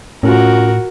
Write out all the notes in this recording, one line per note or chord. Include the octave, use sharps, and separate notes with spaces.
A2 C#4 F4 F#4 A#4